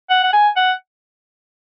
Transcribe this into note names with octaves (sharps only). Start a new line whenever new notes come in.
F#5
F#5
G#5
F#5